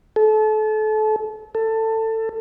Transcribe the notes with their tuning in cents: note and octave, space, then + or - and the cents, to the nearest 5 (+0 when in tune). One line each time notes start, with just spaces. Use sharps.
A4 -30
A4 +20